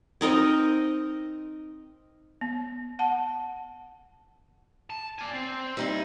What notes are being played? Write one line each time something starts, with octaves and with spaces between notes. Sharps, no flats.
C4 D#4 A#4 D#5
B3
F#5 A5
A5
D5 G#5
C4
G3 D#4 E4